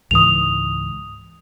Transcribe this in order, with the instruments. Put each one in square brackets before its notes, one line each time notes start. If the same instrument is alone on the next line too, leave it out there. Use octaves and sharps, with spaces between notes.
[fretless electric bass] C#2 G#2 E3 [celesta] D#6 F7